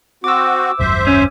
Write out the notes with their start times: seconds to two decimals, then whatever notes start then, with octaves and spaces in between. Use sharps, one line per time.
0.24 C4 F#4 D6 E6
0.79 D#1 G#1 F#2 C5 E5
1.07 C#4